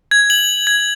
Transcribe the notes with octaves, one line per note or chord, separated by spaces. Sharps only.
G#6
F#7
G#6